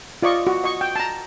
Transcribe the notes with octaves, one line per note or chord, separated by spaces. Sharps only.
F4 D5 D#5 C#6
F#4
D#5 C#6
G5
A5 A#5